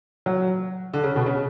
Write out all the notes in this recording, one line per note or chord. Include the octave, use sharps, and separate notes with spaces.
F#3
D3
C#3
B2
C#3